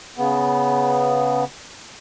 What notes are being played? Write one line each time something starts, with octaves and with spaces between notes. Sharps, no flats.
C#3 B3